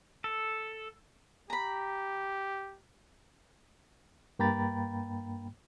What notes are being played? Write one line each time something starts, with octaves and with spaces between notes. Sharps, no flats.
A4
G4 A#5 B5
G2 A#3 G5 A#5 B5 A6